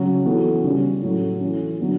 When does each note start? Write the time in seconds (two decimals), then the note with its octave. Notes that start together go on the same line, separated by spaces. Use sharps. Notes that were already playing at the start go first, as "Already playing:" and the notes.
Already playing: C#3 F#3 C#4
0.25 E3 B3 F#4 A4
0.64 C#3 G3 C#4 G4
1.02 A2 F#3 A3 C#4
1.41 E3 A3 C#4
1.79 D3 F#3 B3 F#4